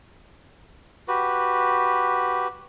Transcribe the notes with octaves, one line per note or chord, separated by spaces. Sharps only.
F#4 G4 B4